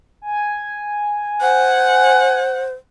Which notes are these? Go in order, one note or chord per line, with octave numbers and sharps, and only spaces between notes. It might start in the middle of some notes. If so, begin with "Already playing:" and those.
G#5
C5 F#5